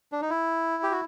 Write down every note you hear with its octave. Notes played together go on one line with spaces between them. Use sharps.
D4
D#4
E4
G4
F#4